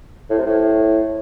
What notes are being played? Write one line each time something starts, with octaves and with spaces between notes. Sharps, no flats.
A2
C3
A2